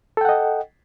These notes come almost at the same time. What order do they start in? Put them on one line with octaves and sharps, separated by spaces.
A4 G5 F#5 D#5